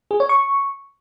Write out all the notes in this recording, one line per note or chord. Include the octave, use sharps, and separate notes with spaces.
G#4
C#5
C#6